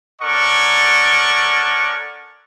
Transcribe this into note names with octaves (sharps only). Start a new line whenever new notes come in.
C#4 A4 A#4 D5 F#5 C#6